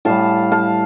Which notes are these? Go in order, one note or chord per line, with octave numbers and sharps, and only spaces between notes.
A2 G3 F5 A5
F5 A5